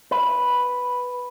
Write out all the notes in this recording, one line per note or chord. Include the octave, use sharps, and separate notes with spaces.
B4